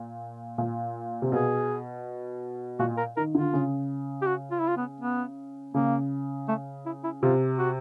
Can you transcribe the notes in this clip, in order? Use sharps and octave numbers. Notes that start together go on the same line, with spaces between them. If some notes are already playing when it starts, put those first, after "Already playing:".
Already playing: A#2
A#2
C3
B2 G#4
A#2 F#4
A#4
D#3 A#4
D3 F4
C#3
G4
F#4
F4
E4
F4
B3
B3
C#3 A#3
A3
E4
E4
C3 F4
F#4